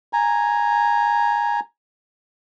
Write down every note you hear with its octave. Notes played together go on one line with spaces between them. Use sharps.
G#5 A#5